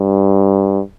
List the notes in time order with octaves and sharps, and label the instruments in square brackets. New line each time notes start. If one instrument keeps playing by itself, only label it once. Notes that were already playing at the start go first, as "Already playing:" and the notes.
Already playing: [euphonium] G2